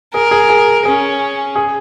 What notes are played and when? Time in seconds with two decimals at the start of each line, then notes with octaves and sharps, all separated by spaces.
0.14 G#4 A#4
0.31 G#4
0.49 G#4
0.85 C#4 G#4
1.56 G#4